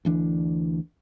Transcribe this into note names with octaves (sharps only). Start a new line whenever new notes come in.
D2 E3 D4